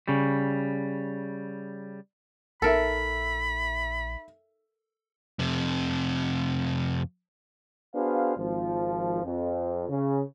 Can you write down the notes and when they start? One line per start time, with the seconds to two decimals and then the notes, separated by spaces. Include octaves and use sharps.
0.08 C#3 G3
2.62 A#1 D#4 A4 A#4 E5 B5
5.39 F2 C3
7.94 B3 D4 F#4 G#4 C5 F5
8.37 G#1 F3
9.24 F2
9.89 C#3